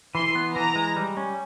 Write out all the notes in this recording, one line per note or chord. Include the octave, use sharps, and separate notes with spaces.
E3 C6
B3
E3 A#5
G#3
G3
C#4